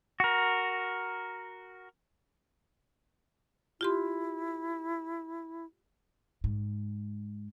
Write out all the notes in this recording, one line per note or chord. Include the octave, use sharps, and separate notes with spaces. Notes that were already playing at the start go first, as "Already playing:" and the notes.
F#4 A#4
E4 F4 G4 C6
G#2